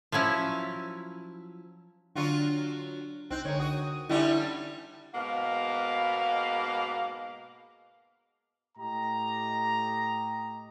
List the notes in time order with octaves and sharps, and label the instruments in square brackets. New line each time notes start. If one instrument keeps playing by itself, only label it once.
[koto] F3 F#3 C#4 E4
[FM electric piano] D3 D4 [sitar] F#3 F4 F#4
[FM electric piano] C2 D#4 G6 [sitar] C4 [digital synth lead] F#6
[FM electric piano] D3 A#4 [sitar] G#3 [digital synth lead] C#5
[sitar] F#4 [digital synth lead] D#6
[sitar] D3 G3 C#4 [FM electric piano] D#4 [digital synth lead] E4
[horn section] G#2 B2 A#3 F5
[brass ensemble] A2 G4 D#5 A#5